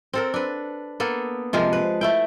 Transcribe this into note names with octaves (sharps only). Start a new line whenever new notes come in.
C4 A4 A#4
D4 B4
A#3 B3 A4
C3 F3 G#3 A#4
B4
A3 E4 G5